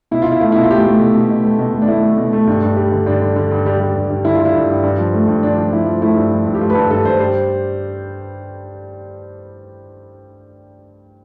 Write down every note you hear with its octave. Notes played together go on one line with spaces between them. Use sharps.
B2 E4
B2 F4
E4
A3 F4
E4
B2
F4
A3 G4
A3
B2
B2
B2
A3
B2
A3
D4
A3 E4
A3
B2
A3
G2
G2
G3
D3
G2 D4
D3
D3
G2
G3
G3
G2
G2
D3 E4
F4
D3
E4
G2
G2
G2
F3
A3
G2
F3 D4
F3
F3 E4
F3
A3 E4
G2
F3
G2
G4
A3 F4
B4
G2 A4
G2 A4
G2 C5
G3 C5